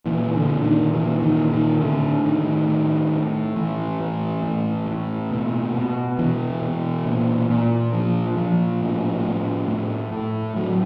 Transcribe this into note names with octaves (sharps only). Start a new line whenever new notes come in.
A#2 E3
D3
A#2
D#3
A#2 E3
D#3
A#2
D#3
A2 D3
A2 D#3
A2
A2
A2 E3
A2
A2
A2
B2
B2
B2 E3
B2
A#2
A#2
A#2 F3
A#2 F3
A2
A2
A2
A2
A2 F#3